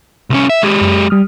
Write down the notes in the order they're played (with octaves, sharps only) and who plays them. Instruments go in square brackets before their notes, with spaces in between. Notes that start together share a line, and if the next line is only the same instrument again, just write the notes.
[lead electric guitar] C2 C#4
E5
[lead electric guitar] G#3 G4 [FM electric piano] G#6
[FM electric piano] F#2
G3 D#6 F6